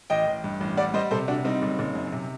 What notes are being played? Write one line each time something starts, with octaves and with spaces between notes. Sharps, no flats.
A1 D#5 G5
A1
G2
A1
G3 D5 F#5
G3 C5 D#5
C3 A4 C5
C3 D4 F#4
G3 C4 D#4
F#1
F#1
F#2
C3